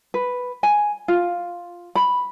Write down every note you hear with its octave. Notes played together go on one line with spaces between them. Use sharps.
B4
G#5
F4
B5